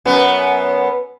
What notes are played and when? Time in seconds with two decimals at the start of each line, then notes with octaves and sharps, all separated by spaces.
0.05 F#2 B3